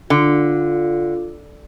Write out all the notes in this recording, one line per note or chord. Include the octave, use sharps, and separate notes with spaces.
D3 F4